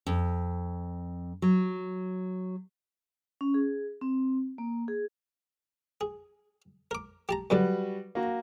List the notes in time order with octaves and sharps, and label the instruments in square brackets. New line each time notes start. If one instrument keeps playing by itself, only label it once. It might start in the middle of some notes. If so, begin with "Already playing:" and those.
[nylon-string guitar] F2
F#3
[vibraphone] C#4
G#4
C4
A#3
G#4
[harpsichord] G#4
A#4 D6
G4 A5 A#5
[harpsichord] F#2 D3 D4 [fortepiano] G3 F#4 B4
[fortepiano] A#3 F#4